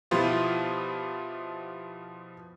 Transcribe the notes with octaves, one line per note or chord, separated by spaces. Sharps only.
B2 F3 B3 E4 F4 G4